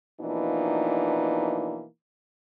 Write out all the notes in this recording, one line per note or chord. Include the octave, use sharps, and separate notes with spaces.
B2 E3 F3 A#3 D4 D#4